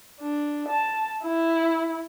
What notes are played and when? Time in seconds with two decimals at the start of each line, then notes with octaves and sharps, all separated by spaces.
0.20 D4
0.68 A5
1.23 E4